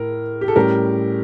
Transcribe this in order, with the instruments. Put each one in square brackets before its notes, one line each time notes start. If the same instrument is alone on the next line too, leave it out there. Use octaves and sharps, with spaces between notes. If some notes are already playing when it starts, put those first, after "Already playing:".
Already playing: [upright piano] A2 A#4
G4
A4
A2 G3 C#4 G4 A#4